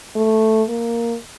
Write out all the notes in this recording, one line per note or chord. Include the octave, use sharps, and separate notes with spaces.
A3
A#3